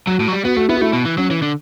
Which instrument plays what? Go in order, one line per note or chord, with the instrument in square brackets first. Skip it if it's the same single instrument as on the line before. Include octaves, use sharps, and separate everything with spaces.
[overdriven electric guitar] F#3 [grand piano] F#4
[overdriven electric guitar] A2
F#3
G3
[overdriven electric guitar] B3 [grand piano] F#4
[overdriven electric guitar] A3 [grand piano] F#4
[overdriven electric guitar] B3 [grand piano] E4
[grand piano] F#4
[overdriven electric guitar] A3 [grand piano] E4
[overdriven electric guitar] B2
E3
[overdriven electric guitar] F#3 [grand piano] C#4
[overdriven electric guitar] E3
D3